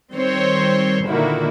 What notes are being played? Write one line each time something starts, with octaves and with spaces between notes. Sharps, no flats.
D#3 G3 C4 C5 C#5 C6
A#2 D3 D#3 A#3 E4 F#4